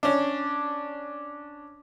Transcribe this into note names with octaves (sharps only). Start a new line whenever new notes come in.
C#4 D4